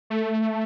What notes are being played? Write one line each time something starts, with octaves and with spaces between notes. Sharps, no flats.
A3